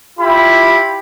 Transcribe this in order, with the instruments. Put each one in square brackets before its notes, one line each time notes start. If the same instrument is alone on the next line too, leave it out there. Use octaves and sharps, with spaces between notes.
[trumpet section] E4 F4 G4 B5